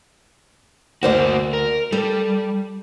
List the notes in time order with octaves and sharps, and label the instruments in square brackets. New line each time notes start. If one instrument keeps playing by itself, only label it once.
[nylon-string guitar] D2 C5 D5 [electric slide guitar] A#3 F#4
[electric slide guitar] A#4
[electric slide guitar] G3 [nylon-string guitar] A4